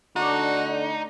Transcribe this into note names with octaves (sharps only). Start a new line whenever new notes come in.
D3 A3 D4 D#4 F#4 D6